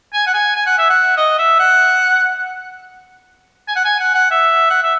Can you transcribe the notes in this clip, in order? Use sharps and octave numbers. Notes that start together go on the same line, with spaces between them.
G#5
F#5
G#5
G#5
F#5
E5
F#5
D#5
E5
F#5
G#5
F#5
G#5
F#5
F#5
E5
F#5
E5